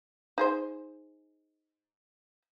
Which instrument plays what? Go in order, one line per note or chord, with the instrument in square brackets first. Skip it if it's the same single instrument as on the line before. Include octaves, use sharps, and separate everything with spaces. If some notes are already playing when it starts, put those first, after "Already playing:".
[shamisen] D#4 G#4 C5